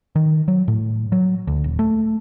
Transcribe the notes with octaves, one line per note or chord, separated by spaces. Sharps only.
D#3
F#3
A2
F#3
D2
D#1
A3